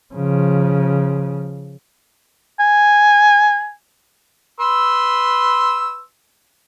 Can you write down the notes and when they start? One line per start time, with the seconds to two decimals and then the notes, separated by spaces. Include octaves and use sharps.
0.15 C#3 F3
2.60 G#5
4.60 B4 C6 E6